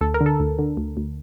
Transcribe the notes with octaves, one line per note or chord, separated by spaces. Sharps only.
D2 A4
A#4
D3
A4
D2
D3
D2
D2